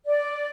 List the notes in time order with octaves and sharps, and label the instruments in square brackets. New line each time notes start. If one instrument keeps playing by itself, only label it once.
[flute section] D5